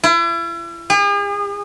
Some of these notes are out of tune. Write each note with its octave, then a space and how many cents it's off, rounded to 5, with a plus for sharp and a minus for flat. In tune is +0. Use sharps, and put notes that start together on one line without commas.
E4 +40
G#4 -45